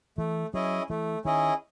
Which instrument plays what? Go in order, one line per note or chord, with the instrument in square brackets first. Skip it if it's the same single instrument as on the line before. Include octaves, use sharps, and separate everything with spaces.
[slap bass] E3 [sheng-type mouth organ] A3
[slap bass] F#3 [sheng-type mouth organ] C#4 E4 G#4 D#5
[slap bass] E3 [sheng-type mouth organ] A3
[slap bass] D#3 [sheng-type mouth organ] C#4 E4 G#4 D#5